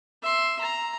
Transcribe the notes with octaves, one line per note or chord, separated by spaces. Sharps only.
E5 C6
A#5